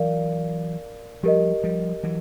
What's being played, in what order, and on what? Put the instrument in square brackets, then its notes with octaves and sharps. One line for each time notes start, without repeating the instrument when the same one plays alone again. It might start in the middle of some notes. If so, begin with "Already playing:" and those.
Already playing: [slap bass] E3 F#3 [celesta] A#4 D5 F5
[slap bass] F3 G3 [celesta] G4 A#4 D#5
[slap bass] F3 G3
E3 F#3